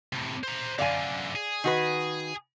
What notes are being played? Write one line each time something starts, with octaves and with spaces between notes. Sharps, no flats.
A2 C3
C5 A#5
F#2 D3 D5 F5 G#5
G#4
D#3 F#4 B4